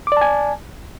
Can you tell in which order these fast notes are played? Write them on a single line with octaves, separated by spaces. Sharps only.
D6 D5 A5 G#5